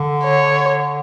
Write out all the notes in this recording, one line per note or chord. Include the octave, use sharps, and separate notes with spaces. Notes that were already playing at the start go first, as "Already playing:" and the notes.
Already playing: D3
C#5